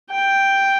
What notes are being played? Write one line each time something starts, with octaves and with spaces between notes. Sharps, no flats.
G5